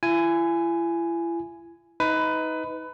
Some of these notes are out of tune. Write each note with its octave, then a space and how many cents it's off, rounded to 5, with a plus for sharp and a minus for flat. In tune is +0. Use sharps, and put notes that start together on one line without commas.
E4 +40 G#5 +0
D#4 +25 B4 +20